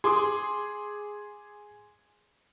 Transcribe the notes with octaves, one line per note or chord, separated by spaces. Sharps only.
G#4 C6 D6 D#6